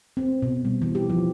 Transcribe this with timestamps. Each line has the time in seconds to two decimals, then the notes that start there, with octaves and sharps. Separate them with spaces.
0.17 C4
0.42 B2
0.65 G3
0.82 E3
0.95 G4
1.10 F3